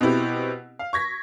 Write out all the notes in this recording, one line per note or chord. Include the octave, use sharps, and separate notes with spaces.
B2 C4 E4 G4
F5
C#6 G#6 A#6 B6